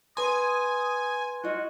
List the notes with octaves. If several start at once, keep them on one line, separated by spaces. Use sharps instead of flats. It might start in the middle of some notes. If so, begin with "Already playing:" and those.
B4 G#5 C6 D#6
F4 F#4 D#5